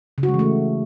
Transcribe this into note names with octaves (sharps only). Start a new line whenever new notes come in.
C#3
F#4
G#3
E3
A3